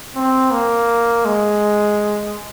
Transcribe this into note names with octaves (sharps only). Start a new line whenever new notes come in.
C4
A#3
G#3